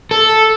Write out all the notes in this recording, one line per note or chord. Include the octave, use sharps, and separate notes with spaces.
A4